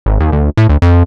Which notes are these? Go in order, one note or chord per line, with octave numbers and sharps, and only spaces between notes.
G#1
D#2
D2
A2
D2
F2